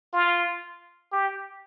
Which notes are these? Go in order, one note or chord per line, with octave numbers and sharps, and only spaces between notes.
F4
G4